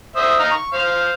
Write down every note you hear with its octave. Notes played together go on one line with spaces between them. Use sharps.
C5 E5 D#6
D#4 F5 A#5
C#6
C5 F5